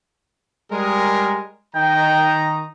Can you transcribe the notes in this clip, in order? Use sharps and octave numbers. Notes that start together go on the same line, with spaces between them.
G3 G#3 A#4
D#3 D#4 G5 A#5